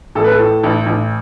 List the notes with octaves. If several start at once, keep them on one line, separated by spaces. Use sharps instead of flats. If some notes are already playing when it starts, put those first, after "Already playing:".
A1 A4
B4
A4
A2
A1
A1